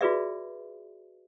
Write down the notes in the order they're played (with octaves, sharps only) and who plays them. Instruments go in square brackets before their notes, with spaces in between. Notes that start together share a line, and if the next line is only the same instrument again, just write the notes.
[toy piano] F4 F#4 G#4 B4 D5 E5